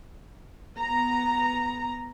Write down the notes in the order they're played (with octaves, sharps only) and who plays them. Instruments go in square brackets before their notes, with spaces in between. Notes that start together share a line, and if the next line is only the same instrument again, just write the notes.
[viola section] B3 A#5